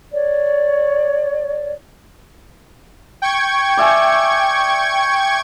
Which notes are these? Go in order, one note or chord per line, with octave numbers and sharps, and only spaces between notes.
C#5 D5
G5 C#6 G#6
D5 E5 G#5